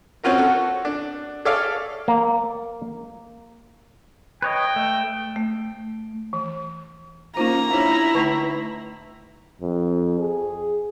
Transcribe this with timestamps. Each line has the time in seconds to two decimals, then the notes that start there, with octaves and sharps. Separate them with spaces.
0.23 C4 C#4 F4 F#4 A#4
0.38 F#4 A4
0.85 D4
1.45 G#4 A4 C#5 D5 E5 F5
2.08 A#3
4.42 B4 C#5 D#5 G5
4.76 A3
5.36 A3
6.33 E3
7.37 A#3 C#4 D#4 F4 C5 A#5
7.74 D4 E4 G4 C#5
8.15 D3 A3 D#4 B4 A5 C#6
9.61 F2
10.20 G#4